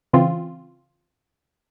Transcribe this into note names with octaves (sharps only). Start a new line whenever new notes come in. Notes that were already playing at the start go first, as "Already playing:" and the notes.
C#3 E3 C4 F4